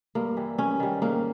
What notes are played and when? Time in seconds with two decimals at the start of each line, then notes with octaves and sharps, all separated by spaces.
0.15 G2 A#3
0.37 E3 G3
0.58 G2 C#4
0.80 D#3 G3
1.02 G#2 A#3